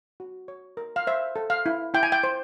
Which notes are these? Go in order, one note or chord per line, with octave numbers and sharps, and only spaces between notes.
F#4
C#5
A#4
F5
C5 E5
A4
F5
E4
E4 G5
G#5
G5
C5